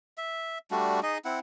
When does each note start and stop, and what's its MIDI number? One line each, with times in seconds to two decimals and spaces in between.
0.18 0.58 76
0.71 1.00 55
0.71 1.00 57
0.71 1.00 62
0.71 1.00 66
1.03 1.18 63
1.03 1.18 68
1.03 1.18 75
1.25 1.39 60
1.25 1.39 64
1.25 1.39 78